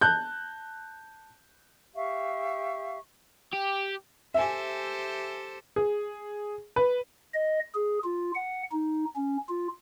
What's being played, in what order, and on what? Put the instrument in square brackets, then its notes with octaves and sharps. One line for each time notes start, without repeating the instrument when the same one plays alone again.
[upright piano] A5 F#6 G6
[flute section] G4 E5 F5 C#6
[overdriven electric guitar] G4
[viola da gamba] G4 A4 C5 [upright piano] E5 G#5
[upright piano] G#4
B4
[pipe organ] D#5
G#4
F4
F#5
D#4
C#4
F4